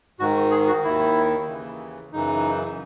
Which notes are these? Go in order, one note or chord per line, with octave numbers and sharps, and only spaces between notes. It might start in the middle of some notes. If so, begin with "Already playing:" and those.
G#2 D#3 F#4
G#4
F#4
D#2 D#3 E4
D#2 C#3 E3
F#2 C#3 E3 D#4